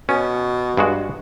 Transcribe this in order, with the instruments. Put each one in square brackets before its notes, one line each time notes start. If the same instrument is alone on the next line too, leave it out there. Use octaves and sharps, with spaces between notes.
[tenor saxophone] B2 [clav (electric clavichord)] C#4
[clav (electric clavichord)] G2 G#3 F#4